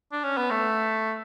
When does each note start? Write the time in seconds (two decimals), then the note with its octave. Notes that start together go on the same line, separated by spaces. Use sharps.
0.12 D4
0.24 C#4
0.37 B3
0.51 A3